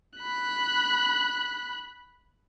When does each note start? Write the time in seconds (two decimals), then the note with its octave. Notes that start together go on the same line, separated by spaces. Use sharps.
0.18 B5 F#6